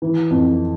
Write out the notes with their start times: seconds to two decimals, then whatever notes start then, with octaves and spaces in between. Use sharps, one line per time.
0.02 E3
0.30 F2